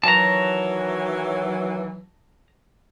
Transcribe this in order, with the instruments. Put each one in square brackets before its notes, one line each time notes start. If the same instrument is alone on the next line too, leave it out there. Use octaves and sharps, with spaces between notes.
[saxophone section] D#3 E3 F#3 [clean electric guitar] A5 A#5